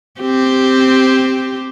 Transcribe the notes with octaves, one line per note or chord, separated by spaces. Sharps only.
C4 G4